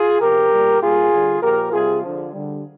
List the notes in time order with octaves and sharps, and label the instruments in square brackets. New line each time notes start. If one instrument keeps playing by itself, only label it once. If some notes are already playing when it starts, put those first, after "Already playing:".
Already playing: [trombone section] F4 G#4
C3 F3 G4 A#4
A#2 G3
A#2 G3 F4 G#4
D3 G3
A#2 F3 G4 A#4
C3 G3 F4 G#4
D3 F3
D3 G3